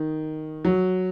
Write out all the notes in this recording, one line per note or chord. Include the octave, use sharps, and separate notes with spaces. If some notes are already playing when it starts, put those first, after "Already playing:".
Already playing: D#3
F#3